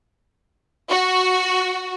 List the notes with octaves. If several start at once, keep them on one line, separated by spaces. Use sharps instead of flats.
F#4